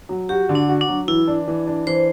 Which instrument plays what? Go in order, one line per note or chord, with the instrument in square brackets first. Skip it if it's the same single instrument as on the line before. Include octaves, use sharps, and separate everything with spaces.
[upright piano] F#3
[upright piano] F#4 [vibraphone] G4
[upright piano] D3
[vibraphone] D4
[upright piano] F#4
[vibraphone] D4
[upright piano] F#3
[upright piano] E3 [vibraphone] E4
[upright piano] D4
E3
D4
[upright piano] E3 [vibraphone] C5